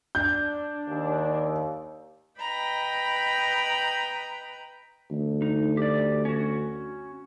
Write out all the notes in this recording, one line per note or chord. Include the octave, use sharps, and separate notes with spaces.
D4 G6
D#2
B4 D#5 G5 A#5 B5
D2
D#4
G4 D5
C#4 F#4